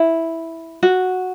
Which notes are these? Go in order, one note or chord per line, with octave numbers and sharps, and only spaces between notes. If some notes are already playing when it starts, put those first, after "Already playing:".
Already playing: E4
F#4